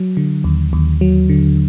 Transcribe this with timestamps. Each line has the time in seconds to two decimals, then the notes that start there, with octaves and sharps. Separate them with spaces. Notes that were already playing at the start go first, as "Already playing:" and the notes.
Already playing: F#3
0.17 D3
0.44 D#2
0.73 D#2
1.01 F#3
1.29 D3